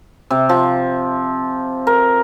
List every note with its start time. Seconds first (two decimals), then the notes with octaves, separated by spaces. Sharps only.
0.30 C3
0.49 F3
1.87 A#4